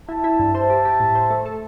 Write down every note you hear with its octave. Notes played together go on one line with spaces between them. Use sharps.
E4 E5 A5
E4
G2
C5 E5 A5
G4
G4
A2
C5
A3
A4